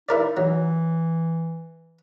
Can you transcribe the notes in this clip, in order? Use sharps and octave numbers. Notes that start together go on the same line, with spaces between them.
D#4 E4 A#4 D5
E3 F#3